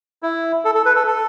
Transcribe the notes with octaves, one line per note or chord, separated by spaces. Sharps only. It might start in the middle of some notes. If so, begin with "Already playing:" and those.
E4
A4
A4
B4
A4
A4